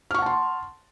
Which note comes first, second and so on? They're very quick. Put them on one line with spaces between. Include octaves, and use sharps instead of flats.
F6 C#6 F#5 A5 C6